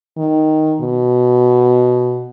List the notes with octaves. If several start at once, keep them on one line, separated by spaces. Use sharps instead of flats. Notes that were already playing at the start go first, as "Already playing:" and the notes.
D#3
B2